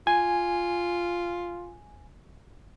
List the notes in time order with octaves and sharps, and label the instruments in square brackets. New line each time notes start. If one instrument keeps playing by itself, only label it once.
[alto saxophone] F4 [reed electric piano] G#5